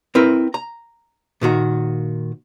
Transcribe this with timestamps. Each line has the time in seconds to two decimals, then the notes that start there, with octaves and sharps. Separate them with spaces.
0.15 C4 E4 A#4 B4
0.54 A#5
1.41 A#2 D#3 F#4 A#5